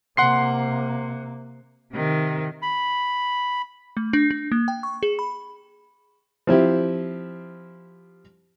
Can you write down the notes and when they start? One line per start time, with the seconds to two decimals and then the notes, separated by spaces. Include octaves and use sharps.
0.17 C3 A#3 F#5 C6 C7
1.94 C3 D#3
2.62 B5
3.97 A3
4.13 D4
4.31 D4
4.52 A#3
4.68 G5
4.83 C#6
5.03 G#4
5.19 B5
6.47 F3 C4 E4 G4